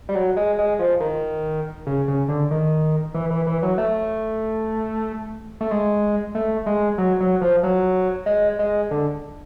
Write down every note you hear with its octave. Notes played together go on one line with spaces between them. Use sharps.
G3
F#3
G#3
G#3
F3
D#3
C#3
C#3
D3
D#3
E3
E3
E3
F#3
A3
A3
G#3
A3
G#3
F#3
F#3
F3
F#3
G#3
G#3
D3